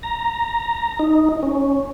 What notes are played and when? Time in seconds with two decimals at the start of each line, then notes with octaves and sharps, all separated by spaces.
0.03 A#5
0.99 D#4
1.43 C#4